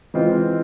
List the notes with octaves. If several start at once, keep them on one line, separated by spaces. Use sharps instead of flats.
E3 G#3 C4 F4